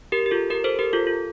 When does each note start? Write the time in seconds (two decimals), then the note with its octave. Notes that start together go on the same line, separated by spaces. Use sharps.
0.12 G4 A#4
0.26 G4
0.31 F4 A4
0.50 G4 A#4
0.64 A4 C5
0.79 G4 A#4
0.93 F4 A4
1.07 F4